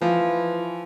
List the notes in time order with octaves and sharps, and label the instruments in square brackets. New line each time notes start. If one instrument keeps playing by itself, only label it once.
[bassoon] E3 [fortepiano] F3